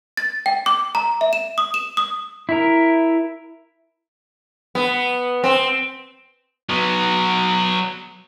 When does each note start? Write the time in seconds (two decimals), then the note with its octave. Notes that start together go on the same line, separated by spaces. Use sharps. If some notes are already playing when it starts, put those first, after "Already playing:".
0.17 A6
0.46 G5
0.66 D6
0.95 A#5
1.21 E5
1.33 E7
1.58 D#6
1.74 E7
1.97 D#6
2.49 E4 A#4
4.75 B3
5.44 C4
6.69 F#3 B3